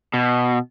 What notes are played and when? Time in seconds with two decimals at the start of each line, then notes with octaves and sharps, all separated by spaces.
0.14 B2